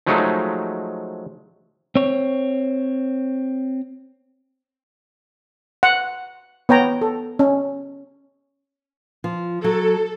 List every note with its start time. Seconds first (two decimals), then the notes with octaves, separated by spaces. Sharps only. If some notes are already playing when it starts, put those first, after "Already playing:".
0.07 F3 F#3 G#3 A3 D#4
1.96 C4 C#5
5.83 F#5
6.69 B3 C#5 G5 A#5
7.02 A4
7.39 C#4
9.24 F3
9.64 F#3 A4